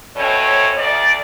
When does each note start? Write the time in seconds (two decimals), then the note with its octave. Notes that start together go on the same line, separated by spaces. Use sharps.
0.16 B2 A3 C4 C#4 C#5
0.78 D2 D5